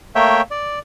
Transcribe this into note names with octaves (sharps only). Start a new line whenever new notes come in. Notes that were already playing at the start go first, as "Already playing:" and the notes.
A3 A#3 C#5 E5 G5
D5